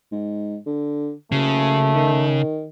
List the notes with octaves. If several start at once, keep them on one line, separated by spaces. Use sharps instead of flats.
G#2
D3
F#1 C#3 A3
D#3